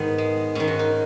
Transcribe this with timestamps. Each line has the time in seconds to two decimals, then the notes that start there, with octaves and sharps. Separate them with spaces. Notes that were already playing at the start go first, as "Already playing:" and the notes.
Already playing: G#2 D#3 B3
0.18 G#3
0.55 G#2 D#3 C#4
0.68 F#4
0.79 D#4